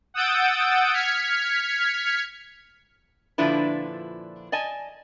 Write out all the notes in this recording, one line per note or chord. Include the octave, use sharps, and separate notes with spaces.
F#5 D#6 E6 G6 A6 D7
F6 G#6 B6 C#7
A#2 D3 F3 D4 E4 B4
D5 D#5 G#5 A5